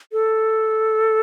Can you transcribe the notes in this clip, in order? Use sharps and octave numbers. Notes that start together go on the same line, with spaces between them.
A4